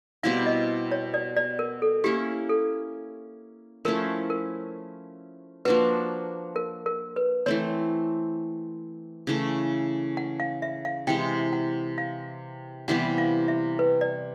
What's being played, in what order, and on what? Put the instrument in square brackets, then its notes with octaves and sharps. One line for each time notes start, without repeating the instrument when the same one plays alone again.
[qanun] B2 G3 C4 E4 [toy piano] F5
[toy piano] D#5
C#5
D5
D5
A#4
A4
[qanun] A#3 C#4 E4 [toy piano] G4
[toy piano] A4
[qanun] F3 A3 C#4 E4 [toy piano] A#4
[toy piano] A#4
[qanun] F3 A#3 D4 F#4 [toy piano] B4
[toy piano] A#4
A#4
B4
[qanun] E3 A3 C4 [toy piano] C#5
[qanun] C#3 E3 A3
[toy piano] F#5
F5
E5
F5
[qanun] C3 E3 G#3 [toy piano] G5
[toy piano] F#5
F5
[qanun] C3 E3 G3 B3 [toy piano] F#5
[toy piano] F5
E5
B4
D5